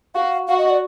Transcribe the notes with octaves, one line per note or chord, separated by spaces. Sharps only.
F#4 F5
F#4 F5
D#5
D5